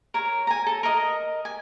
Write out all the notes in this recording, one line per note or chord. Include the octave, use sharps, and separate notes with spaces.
A#4 C#5
G#5 A#5
A4
A#4 D#5
G#5